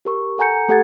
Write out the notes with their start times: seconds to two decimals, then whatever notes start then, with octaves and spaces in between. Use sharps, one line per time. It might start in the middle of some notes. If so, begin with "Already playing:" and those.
0.05 G4 A#4 C#6
0.38 A4 F#5 G#5 A#5 G6 C#7
0.68 A3 G4 A4 F#5 G#6 A6